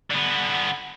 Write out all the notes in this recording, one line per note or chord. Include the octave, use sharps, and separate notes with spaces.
D3 B3